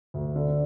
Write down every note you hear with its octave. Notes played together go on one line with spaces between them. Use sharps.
D2
D3